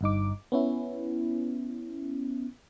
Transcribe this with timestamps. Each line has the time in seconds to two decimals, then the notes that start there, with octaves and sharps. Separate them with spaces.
0.01 G1 G2 D#4 D6
0.52 B3 C#4 E4